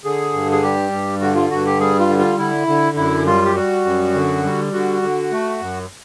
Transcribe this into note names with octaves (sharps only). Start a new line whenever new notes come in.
D3 G#4
G2
G#4
G3 G4
G2
D3 F#4
F4
G2 F#4
G4
G3 G#4
F4
D3
F4
D3 E4
D3
F#2 E4
G3 F4
G4
G3 F#4
F#2
D3
G3
D3 F#4
D3
A3
F#2